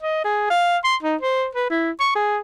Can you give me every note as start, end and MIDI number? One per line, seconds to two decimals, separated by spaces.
0.02 0.24 75
0.24 0.48 68
0.50 0.78 77
0.84 0.96 84
1.03 1.16 63
1.21 1.48 72
1.55 1.67 71
1.70 1.91 64
2.00 2.12 85
2.15 2.39 68